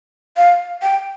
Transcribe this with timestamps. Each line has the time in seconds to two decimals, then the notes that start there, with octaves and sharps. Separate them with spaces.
0.37 F5
0.82 G5